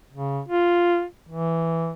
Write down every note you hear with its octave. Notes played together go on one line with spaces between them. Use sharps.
C#3
F4
E3